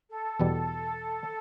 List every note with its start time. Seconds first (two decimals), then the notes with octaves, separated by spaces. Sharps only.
0.10 A4
0.40 E2 B2 G3